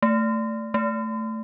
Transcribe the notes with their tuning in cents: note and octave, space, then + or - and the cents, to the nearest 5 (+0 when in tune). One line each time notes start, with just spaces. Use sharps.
A3 +15
A3 +5